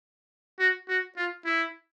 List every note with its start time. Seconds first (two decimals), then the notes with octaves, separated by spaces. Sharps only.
0.60 F#4
0.89 F#4
1.17 F4
1.45 E4